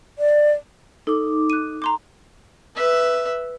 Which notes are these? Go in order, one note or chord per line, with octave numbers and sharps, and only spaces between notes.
D5
D#4 A4 D6
F#6 D#7
A#5 C6 D6
B4 E5